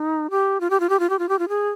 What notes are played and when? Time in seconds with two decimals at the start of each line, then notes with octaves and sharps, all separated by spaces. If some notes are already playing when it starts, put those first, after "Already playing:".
Already playing: D#4
0.31 G4
0.60 F4
0.70 G4
0.80 F4
0.89 G4
1.00 F4
1.10 G4
1.19 F4
1.29 G4
1.39 F4
1.49 G#4